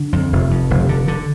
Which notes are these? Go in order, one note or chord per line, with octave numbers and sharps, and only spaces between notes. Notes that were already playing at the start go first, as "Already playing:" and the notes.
Already playing: D3
F2
F1
F2
F1
D3
D3